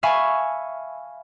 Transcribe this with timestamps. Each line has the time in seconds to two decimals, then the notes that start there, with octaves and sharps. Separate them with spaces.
0.03 E5 F5 G#5 A5 B5 C#6